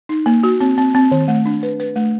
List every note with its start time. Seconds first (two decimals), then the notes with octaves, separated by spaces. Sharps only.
0.09 D#4
0.26 A#3
0.43 F#4
0.61 C4
0.78 C4
0.95 C4
1.11 D#3
1.28 A3
1.46 D4
1.63 B4
1.80 B4
1.96 A3